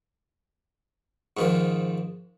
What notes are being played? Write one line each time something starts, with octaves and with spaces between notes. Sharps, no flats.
G#2 D#3 F3